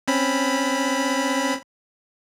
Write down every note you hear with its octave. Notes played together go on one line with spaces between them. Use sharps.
C4 C#4 B5